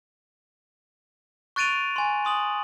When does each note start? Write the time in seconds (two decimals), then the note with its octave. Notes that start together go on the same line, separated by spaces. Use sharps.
1.56 C#6 F#6 A6 D7 D#7 F7
1.96 G#5 C6
2.25 C6 D#6 F#7